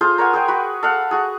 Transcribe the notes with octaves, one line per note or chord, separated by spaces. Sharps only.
F4 G#4 A4 C5
A#4 C#5 F#5 G#5
G#4 C5 G5
F#4 B4
A4 F5 F#5
F#4 G#4